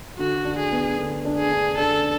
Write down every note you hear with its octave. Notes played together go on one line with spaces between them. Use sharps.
D3 F#4
D4
G#4
B3
D3
D4
G#4
D4
D4 A4